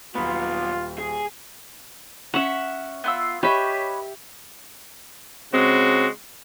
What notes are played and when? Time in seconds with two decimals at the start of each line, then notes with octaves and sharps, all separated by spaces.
0.15 D#1 F#3 B3 F4 B5
0.98 G#4
2.34 C#4 E5 F#5
3.04 B3 F4 E6
3.43 G4 B4 C#5 D#5 E5
5.54 C#3 G#3 C4 F#4